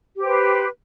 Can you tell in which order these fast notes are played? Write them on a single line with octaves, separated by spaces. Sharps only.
G4 C5 B4